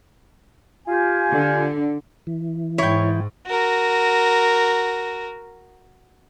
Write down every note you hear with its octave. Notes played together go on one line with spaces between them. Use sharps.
F4 G4 G#5
D3
E3
G#2 E4 C#5 G5
F#4 A#4